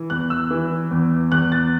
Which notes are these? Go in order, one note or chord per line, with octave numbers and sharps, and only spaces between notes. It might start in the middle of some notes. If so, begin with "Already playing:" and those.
Already playing: E3
E2 F#6
E6
E3
E2
E2 F#6
A6